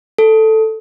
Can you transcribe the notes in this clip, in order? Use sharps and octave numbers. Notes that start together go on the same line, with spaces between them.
A4